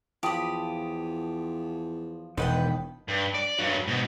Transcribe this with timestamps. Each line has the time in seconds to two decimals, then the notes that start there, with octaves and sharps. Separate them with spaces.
0.23 E2 F3 G4 B5 D#6
2.37 E1 D#3 B4 F#5 G5
3.08 G2
3.34 D5
3.58 G2 F#3
3.87 G#2 B2